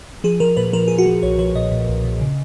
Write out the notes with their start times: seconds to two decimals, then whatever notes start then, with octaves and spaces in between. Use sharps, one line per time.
0.24 F3 G#4
0.40 F3 A#4
0.57 A#2 B4
0.73 F3 A#4
0.88 A#2 G#4
0.98 F#4
1.06 F3
1.23 B1 C#5
1.38 F3 C#5
1.55 A#2 D#5
1.72 A#2
1.88 B1
2.04 A#2
2.21 C#3